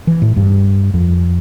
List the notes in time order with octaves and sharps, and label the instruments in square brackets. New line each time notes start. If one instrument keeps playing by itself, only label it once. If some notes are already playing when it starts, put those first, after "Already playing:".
[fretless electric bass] E3
A2
G2
F2